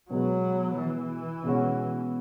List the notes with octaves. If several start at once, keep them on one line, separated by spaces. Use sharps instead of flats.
B2 F#3 G#3 B3
E3
B2 G#3 C#4 F#4